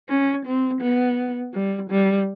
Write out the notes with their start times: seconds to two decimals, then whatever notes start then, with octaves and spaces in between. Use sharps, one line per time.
0.09 C#4
0.46 C4
0.82 B3
1.54 G3
1.90 G3